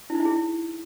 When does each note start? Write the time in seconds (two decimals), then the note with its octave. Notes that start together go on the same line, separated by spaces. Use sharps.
0.10 E4
0.15 D#4
0.20 E4
0.25 G#4
0.30 E4